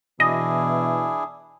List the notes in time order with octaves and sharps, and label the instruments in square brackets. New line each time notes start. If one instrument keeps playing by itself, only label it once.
[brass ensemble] B2 E3 [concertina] D4 E4 G#4 [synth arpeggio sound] D#5